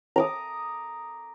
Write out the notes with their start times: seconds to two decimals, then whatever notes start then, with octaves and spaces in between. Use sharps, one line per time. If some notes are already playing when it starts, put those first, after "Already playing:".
0.16 A#5 D6 D#6